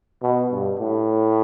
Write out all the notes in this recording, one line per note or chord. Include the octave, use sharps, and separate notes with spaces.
B2
G2
A2